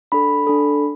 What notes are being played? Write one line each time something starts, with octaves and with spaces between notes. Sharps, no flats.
D4 A4 B5
D4 A4